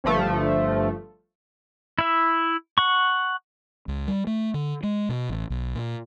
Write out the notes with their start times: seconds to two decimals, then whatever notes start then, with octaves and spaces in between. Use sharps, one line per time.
0.04 G1 G2 F3 A3
1.99 E4 E5
2.78 F#5 C#6
3.88 C#2
4.08 G3
4.27 A3
4.54 D3
4.83 G#3
5.09 B2
5.29 A1
5.50 B1
5.75 A#2